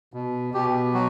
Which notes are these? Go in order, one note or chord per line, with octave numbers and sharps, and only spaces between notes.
B2
B2 G4
F#3 F#4